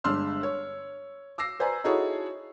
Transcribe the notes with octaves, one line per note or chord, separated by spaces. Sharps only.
G1 G#3 D4 C6 E6 F6
C#5
D6 E6 A#6 C7
B4 C5 D5 G#5 A#5
D#4 E4 F#4 G#4 A4 C#5